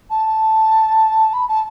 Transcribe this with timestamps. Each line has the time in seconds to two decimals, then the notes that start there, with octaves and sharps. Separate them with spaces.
0.09 A5
1.33 B5
1.48 A5